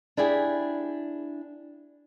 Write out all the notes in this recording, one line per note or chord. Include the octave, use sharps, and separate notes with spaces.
D4 E4 G4 G#4